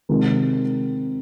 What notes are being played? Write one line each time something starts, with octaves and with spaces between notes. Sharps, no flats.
C3 D#3 G#3